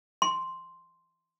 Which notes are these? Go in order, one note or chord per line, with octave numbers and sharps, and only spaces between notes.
C6